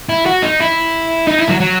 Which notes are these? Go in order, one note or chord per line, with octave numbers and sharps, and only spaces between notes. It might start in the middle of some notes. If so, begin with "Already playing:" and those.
E4
F#4
D#4
E4
D#4
E4
F#3
F#3